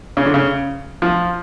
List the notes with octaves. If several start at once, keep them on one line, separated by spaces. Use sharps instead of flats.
C#3
D3
C#3
F3